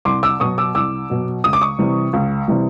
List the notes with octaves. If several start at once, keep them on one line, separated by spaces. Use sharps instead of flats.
C2 C6 D6
D6 E6
B2 F#3 C#6 D#6
D6 E6
C2 D6 E6
B2 F#3
C#2 D#6
D6
C#6 D#6
C3 E3 G3
C#2
C3 E3 G3